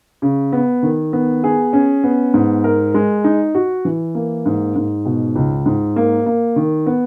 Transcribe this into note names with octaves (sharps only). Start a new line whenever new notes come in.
C#3
B3
D#3
B3
G#4
C#4
B3
G#2
A#4
G#3
D#4
F#4
E3
A#3
G#2
G#2
B2
C#2
G#2
A#3
A#3
D#3
B3